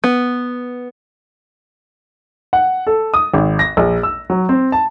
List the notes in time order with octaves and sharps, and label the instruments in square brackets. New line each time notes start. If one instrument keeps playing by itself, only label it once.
[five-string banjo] B3
[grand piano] F#5
A4
D#6
G#1
A#6
A#1
E6
F#3
C4
A5